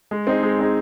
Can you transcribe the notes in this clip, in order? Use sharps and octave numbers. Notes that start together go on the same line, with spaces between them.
G#3
C4 D#4 G#4
G#3
C4 D#4 G#4